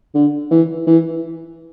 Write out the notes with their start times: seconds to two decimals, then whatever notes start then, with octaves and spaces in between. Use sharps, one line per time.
0.15 D3
0.51 E3
0.87 E3